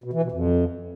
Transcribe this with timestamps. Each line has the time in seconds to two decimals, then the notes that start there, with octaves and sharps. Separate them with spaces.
0.04 B2
0.13 E3
0.22 B2
0.32 F2